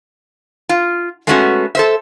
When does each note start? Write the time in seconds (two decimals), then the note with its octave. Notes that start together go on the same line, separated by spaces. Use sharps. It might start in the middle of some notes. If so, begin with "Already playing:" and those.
0.69 F4
1.27 G#3 A3 B3 C#4 D#4 F#4
1.75 A4 C5 E5